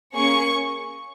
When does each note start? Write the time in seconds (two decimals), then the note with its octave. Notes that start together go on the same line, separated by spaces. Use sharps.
0.15 A#3 C#4 G#4 C#6